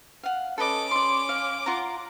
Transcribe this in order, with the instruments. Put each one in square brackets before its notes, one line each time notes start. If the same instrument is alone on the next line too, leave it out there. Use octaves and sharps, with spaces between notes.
[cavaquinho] F5 F#5
[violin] C#4 D6 [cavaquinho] A4 B4 D#5
[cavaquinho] D5 C6
F5
F4 F#5 A#5